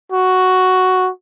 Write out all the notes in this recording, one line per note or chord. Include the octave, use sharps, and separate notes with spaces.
F#4